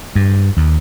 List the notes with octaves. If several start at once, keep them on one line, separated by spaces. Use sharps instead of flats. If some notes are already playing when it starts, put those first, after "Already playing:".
G2
D#2